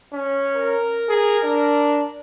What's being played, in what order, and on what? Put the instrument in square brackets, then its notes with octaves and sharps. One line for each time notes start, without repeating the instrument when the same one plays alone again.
[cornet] C#4
[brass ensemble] A#4
[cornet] G#4
D4